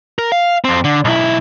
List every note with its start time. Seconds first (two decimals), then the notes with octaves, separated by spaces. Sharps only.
0.19 A#4
0.32 F5
0.64 F2 C4
0.84 D3
1.05 B1 E4